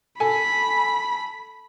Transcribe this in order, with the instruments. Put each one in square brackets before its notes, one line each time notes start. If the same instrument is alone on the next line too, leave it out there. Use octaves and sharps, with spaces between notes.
[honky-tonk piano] A4 G#5 [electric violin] B5